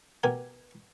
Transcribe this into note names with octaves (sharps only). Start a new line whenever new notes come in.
B2 G4 A#4 G#5